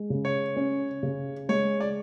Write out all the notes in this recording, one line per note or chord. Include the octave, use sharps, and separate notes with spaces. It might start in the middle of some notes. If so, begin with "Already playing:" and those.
Already playing: G#3
C#3
C#5
C#4
C#3
G#3 C#5
D5